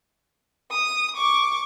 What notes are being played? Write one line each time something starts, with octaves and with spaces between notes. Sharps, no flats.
D#6
C#6 D6